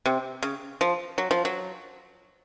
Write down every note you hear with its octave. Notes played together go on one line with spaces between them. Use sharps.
C3
C#3
F3
F#3
F3
F#3